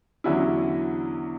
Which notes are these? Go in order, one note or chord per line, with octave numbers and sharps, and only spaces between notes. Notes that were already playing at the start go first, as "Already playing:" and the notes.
E2 D3 F#3 C#4 E4